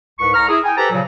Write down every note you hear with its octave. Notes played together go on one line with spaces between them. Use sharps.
C2 G#2 B4 C#6
C2 A#5 C#6 F6
E4 G#4
G5 G#5
G4 A4 B4 C5 A5 A#5
A#2 C#3 F3 F#3